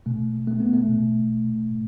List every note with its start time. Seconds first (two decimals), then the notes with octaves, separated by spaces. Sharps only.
0.06 B2 A3
0.34 B2
0.47 A3
0.60 B2 B3
0.73 A3
0.88 B2
1.17 B2
1.44 B2
1.71 A2